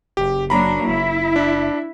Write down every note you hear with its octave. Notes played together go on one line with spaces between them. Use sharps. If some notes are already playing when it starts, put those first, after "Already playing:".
F#1 G4
F#3 A#3 D4 A#5 B5
F#1 E4
D4